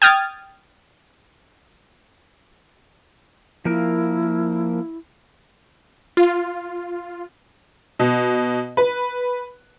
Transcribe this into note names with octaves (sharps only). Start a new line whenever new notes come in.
G5 D#6 F6 G#6 A6
F3 A#3 E4 A#4
F4
B2
B4